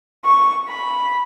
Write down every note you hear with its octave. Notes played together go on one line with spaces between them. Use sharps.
C#6
B5